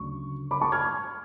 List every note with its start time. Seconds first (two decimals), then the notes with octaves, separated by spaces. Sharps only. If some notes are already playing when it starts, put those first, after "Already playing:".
Already playing: D2 C#3 F#3 C#6
0.51 B5 D6
0.61 A5 C#6
0.72 F6 G#6